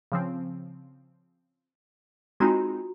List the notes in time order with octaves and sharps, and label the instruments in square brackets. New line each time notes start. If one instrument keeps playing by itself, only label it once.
[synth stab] C#3 F3 C4
[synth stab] G#3 C4 D#4 [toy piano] F4 F#4 A#5